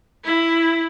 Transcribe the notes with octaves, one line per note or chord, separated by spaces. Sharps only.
E4